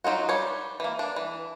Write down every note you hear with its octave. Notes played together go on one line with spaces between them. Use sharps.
F#3 D#4 F4 F#4
G3 C#5
E3 A#3
D4
E3